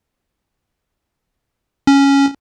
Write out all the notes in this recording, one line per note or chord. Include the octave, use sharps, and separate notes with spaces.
C#4